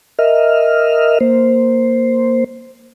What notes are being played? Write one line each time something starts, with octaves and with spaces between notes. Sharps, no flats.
A#4 D#5 E5 F6
A#3 C5